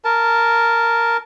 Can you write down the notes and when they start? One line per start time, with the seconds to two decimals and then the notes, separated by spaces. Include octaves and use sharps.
0.05 A#4 A5